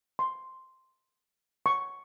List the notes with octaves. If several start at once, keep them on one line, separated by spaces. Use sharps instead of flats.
C6
C#6